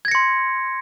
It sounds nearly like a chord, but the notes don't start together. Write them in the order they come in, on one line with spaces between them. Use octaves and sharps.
G#6 A#6 C#7 C6